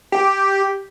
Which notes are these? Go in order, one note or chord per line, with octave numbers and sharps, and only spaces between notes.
G4